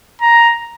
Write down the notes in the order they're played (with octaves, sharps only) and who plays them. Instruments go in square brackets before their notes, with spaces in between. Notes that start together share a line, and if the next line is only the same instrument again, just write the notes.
[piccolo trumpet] A#5